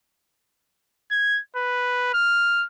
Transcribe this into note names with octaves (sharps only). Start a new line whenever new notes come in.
G#6
B4
F6